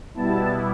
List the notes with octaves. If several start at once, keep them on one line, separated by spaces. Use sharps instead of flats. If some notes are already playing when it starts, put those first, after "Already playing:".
B2 G3 B3 E4 A5